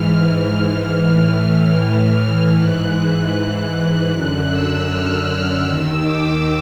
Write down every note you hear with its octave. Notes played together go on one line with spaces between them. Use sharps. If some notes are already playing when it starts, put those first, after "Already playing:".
Already playing: G#2 E3 F6
A2 E3
G#2 E3 F#6
F#2 D3 F#6
E6
F6
F6
D#2 D#3 E6
D6